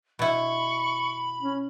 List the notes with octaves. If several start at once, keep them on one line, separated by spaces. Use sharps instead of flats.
B2 E4 B5 C#6
C#4